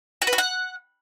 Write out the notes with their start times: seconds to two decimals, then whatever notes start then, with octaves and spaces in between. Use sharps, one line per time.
0.22 F#4
0.27 B4
0.33 F#4
0.38 F#5